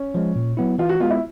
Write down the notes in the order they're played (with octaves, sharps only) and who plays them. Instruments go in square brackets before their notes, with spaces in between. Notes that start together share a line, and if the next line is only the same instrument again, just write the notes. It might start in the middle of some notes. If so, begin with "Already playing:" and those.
Already playing: [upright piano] C#4
[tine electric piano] F3 G#3
A#2
F#3 B3 E4
[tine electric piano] E3 [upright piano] F4
[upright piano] F#4
[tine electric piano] B3 [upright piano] F4
[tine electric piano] G#3
[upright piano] E4